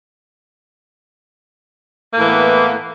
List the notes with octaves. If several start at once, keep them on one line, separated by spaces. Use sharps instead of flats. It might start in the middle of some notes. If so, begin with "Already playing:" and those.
A2 E3 A#3 B3